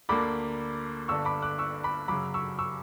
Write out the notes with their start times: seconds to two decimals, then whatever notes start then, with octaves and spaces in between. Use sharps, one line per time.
0.09 D2 D3 A#3 B5 D6
1.08 G1 G2 D3 C#6 E6
1.25 B5 D6
1.42 D6 F#6
1.58 C#6 E6
1.83 B5 D6
2.08 F#2 C#3 F#3 B5 D6
2.34 C#6 E6
2.58 C#6 E6